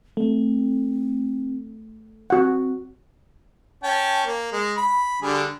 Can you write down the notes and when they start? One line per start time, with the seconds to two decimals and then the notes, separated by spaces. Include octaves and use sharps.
0.17 A3 C4
2.30 C4 F#4 F#5
3.83 C#4 G5 A5
4.26 A#3
4.52 G#3
4.77 B5
5.22 D3 G3 G#4